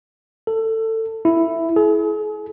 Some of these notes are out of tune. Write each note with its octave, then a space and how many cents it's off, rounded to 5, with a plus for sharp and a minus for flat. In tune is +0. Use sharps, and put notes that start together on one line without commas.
A4 +20
E4 +5
G#4 +40